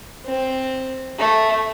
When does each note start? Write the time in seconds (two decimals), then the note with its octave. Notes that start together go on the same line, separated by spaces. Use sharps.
0.26 C4
1.19 A3